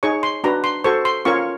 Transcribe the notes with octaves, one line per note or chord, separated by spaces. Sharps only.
D#4 G#4 C#5 C#6
C6
D4 F#4 B4 A#5
C6
F#4 A4 C5 C#6
C6
C#4 F4 A#4 C#5 C#6